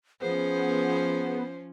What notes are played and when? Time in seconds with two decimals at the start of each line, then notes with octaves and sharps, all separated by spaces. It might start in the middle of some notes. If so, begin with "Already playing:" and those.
0.21 F3 B3 C#4 G#4 C5